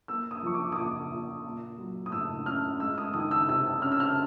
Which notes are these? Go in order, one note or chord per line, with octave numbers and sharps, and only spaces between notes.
A#3 E6
D#6
F3 C#6
D6
D#6
A#2 D6
A#2
A#3
F#3
D#6
A2 E6
C#4 F6
G#3 E6
D#6
D#3 D#6
E6
C3 E6
C#4 F6
E6
F6